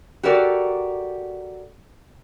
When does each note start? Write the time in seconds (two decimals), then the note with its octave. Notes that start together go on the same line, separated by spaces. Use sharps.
0.23 F#4 G4 A4 A#4 D5